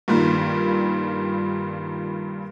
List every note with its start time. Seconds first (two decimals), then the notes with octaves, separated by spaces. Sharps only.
0.08 G2 A#2 D#3 G3